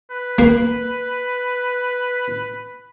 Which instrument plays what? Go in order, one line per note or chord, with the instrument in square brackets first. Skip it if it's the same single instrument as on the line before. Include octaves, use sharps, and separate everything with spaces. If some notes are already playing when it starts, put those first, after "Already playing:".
[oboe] B4
[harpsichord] A#3